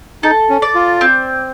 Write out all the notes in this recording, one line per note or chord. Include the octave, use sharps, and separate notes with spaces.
D#4 A4
C#4
D5
F4
C4